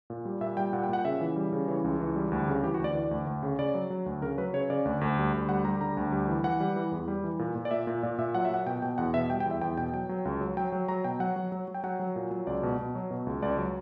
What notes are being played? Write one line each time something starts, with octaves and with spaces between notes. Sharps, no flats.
A#2
G3
A#2 E5
G3 G5
A#2 F#5
G5
A#2 F#5
C#3 E5
E3
G3
C#3
E3 C#5
C#2
E3
G3
D2
C#3
E3 G4
F#4
D2 D5
E3 D5
D2
D2
C#3
C#3 D5
F#3
F#3
D2
C#3 A#4
F#3 B4
C#3 C#5
C#3 D5
D2
D2
G3
D2
G3 F#5
G3 A#5
D3 A#5
D2
G3
E3
E3 F#5
G3
E3
E2
G3
E3
A#2
A#2
D5
A#2 E5
A#2
A#2 D5
A#2 E5
F#3 F#5
E5
A#2 F#5
B2 G5
B2 G5
E2 F#5
B2 E5
G3 G5
G5
E2
E5
E2 G5
B2 G5
F#3 G5
F#3
C#2
F#3
F#3 G5
F#3
F#3 A#5
B2 G5
F#3 F#5
F#3
F#3
F#3
G5
F#3 F#5
F#3
A#2
F#3
C#2 D5
B2
B2
F#3
B2
C#2
C#2 D5
F#3